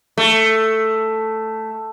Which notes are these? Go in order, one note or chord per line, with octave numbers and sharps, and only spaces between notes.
A3